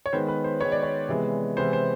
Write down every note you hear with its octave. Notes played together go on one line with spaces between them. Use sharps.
C#5
D#3 G#3 B3 C5
B4
C5
D#3 G#3 B3 C#5
D5
C#5
C3 E3 G#3 B3
C3 E3 G#3 B3 C5
C5